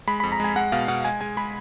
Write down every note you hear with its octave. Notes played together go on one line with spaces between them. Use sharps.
G#3 B5
F2 B5
A#5
G#3 G#5
G#3 F#5
B2 F5
B2 F#5
G#3 G#5
G#3 G#5
G#3 B5